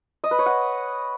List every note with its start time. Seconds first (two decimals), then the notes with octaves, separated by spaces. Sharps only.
0.24 D#5
0.31 B4
0.39 C#5
0.46 F#5